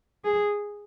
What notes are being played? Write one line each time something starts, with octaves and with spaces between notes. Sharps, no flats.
G#4